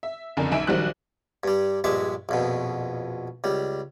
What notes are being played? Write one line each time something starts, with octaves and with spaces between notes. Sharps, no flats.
E5
F#1 F2 D3 A#4 G#5
B1 D#4 E5 G#5 D7 E7
A#1 D#3 F#3 G3 C5 F#6
G2 G3
A#1 G2 G#3 E5 D6
A#1 F2 B2
C#2 G3